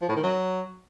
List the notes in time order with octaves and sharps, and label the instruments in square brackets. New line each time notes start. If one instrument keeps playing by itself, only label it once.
[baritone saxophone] F3
A2
D#3
F#3